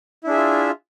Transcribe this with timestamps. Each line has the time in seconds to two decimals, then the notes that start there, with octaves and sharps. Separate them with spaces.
0.24 E4
0.27 D4
0.30 G#4
0.33 E5
0.36 F4